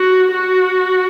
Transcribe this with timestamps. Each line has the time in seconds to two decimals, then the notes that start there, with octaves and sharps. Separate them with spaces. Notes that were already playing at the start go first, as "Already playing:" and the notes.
Already playing: F#4
0.33 F#4